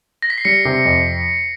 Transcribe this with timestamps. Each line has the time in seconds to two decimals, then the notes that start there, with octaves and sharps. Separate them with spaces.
0.22 A#6
0.30 B6
0.38 C7
0.45 G3 B6 C#7
0.65 C3
0.85 F2